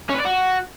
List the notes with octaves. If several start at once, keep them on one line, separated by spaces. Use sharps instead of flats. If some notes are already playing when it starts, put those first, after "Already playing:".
C#4
B4
D5
F#4